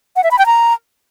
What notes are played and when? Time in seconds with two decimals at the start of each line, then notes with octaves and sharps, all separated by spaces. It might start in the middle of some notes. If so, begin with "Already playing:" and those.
0.16 F#5
0.24 E5
0.31 B5
0.39 G5
0.46 A#5